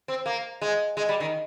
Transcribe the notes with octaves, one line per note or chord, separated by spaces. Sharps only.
C4
A#3
G#3
G#3
G3
D#3